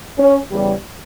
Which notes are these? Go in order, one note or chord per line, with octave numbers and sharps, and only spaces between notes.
C#4
E2 C#3 G3